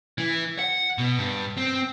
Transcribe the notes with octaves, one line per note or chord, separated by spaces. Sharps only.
E3
F#5
B2
G2
C4